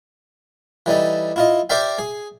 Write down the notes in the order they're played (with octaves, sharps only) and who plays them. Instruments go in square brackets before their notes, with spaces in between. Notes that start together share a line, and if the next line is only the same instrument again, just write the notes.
[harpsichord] E3 G3 D#4 A4
E4 F4 D#5
G4 A#4 C5 D5 E5 G5
G#4